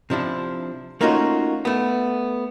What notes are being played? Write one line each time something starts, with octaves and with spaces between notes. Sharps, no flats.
C3 F3 D4 E4
A3 A#3 C#4 D#4 F4 F#4
A3 B3